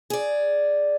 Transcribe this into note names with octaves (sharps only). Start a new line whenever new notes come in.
G#4 D5